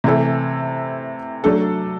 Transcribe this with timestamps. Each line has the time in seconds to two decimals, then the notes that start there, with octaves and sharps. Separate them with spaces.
0.04 C3 E3 A3 E4 A4
1.44 F#3 A3 D4 A4